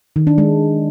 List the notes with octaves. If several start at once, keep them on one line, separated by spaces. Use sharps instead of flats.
D#3
D4
G#3